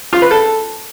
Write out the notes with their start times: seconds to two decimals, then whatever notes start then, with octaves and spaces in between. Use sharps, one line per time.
0.13 F4
0.22 B4
0.31 A4